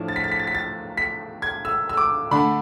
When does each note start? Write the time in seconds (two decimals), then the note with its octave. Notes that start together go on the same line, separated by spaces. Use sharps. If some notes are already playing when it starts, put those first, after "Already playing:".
Already playing: A2 F3 A3 D4
0.08 A6
0.16 B6
0.24 A6
0.31 B6
0.39 A6
0.47 B6
0.55 A6
0.97 B6
1.42 G#6
1.65 E6
1.89 E6
1.97 D6
2.31 D3 A3 D4 B5